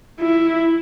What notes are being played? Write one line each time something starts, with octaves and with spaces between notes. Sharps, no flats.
E4